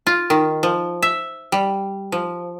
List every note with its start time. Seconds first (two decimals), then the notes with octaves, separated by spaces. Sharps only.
0.07 F4
0.30 D#3
0.63 F3
1.02 E5
1.52 G3
2.12 F3